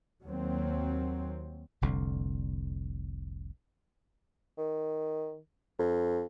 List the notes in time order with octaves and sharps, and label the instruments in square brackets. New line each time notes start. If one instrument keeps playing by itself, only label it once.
[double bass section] D#2 F#3 A#3 C4
[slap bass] F1 C2 D3
[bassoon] D#3
F2